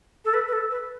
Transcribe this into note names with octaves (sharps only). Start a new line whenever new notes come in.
A4
B4
B4
A4
B4